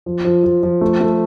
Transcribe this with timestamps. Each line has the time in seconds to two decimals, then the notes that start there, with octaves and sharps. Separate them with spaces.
0.06 F3
0.25 F3
0.44 F3
0.63 F3
0.81 A3
1.00 A3